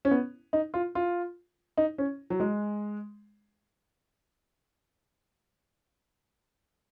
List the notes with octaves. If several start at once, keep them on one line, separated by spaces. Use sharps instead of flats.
C#4
B3
D#4
F4
F4
D#4
C#4
F#3
G#3